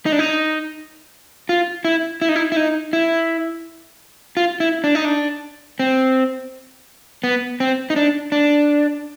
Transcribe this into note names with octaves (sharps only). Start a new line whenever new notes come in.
D#4
D4
D#4
F4
E4
E4
D#4
E4
E4
D#4
E4
F4
E4
D4
D#4
D4
C4
B3
C4
D#4
D4
D4